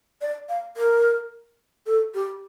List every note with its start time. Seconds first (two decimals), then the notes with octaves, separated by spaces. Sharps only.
0.21 D5
0.49 F5
0.77 A#4
1.86 A4
2.14 G4